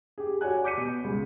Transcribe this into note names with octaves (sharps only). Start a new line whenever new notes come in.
G4 G#4
F#4 C#5 D5 G#5 F#6
D6 G6 B6 C#7 D#7
B2
C#2